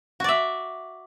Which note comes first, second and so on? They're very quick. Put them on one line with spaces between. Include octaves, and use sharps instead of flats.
F#4 D5 E5